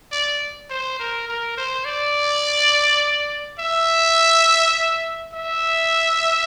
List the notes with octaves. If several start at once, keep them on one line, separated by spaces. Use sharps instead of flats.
D5
C5
A#4
A#4
C5
D5
E5
E5